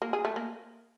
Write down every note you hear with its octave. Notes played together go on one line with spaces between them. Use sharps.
A#3
G#4
A3
A#3